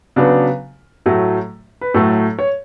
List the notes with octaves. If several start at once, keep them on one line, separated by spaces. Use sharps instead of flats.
C#3 F#3 B3 D4
A2 F#3 A3
B4
A2 F#3 A3 A4
C#5